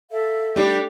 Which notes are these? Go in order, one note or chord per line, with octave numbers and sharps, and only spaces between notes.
A4 E5 F5
G3 A3 D4 G4 D5